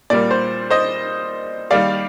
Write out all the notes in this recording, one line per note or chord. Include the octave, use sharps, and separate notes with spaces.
A#2 G3 A#3 D5
C5
C5 D#5
D#3 G3 A#3 D5 F5